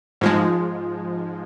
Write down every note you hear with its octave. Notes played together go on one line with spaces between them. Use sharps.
G#2 F3 G#3